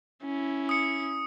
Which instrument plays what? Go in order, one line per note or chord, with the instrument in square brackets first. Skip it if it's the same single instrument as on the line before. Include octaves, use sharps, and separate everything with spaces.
[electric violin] C#4 E4
[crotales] D#6 C#7